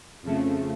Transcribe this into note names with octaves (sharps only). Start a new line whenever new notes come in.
F2 C#3 F3 A3